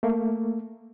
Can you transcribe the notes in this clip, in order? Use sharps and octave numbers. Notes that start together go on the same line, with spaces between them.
A3 A#3